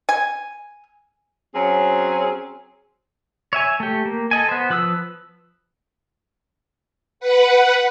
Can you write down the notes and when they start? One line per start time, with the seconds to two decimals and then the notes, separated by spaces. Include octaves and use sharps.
0.09 G#5
1.55 F#3 C4 C#4 G#4
3.53 C#5 E5 G#5
3.80 A3 G4
4.05 A#3
4.31 A4 D#5 G#5
4.49 B3 C5
4.70 F3 B4 D#6 E6
7.20 B4 F#5